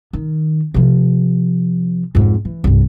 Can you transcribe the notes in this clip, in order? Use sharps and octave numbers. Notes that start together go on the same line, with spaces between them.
D#3
C3 F3
F2 G#2
E3
C2 G2